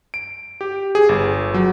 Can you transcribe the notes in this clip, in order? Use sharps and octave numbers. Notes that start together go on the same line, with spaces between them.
D7
G4
G#4
G1
F#3